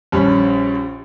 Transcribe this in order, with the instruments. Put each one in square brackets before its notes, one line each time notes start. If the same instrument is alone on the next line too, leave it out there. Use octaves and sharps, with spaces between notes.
[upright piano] A#1 G3 C#4